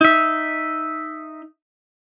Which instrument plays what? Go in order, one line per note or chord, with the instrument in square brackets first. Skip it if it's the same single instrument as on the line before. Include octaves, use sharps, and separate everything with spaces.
[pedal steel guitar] D#4 E5